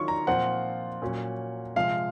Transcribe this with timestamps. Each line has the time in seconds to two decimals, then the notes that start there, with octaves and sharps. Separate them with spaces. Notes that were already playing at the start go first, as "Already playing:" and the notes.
Already playing: D#3 F#3 C#4 F4 C#6
0.08 A#5
0.27 A#2 F3 C4 F4 F#5
1.02 A#2 F#3 C#4
1.76 C3 F3 G#3 F5